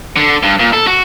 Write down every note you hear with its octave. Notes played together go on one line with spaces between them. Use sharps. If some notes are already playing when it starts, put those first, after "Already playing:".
D3
G2
A#2
A4
F#4